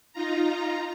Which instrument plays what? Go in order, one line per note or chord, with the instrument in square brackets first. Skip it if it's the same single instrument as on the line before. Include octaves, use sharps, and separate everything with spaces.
[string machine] D#4 F4 A#5